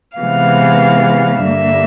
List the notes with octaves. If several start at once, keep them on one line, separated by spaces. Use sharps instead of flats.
C3 E3 G#3 B3 F5
G2 D3 G3 A#3 E5